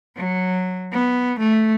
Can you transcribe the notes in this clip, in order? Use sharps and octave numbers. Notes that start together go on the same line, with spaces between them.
F#3
B3
A3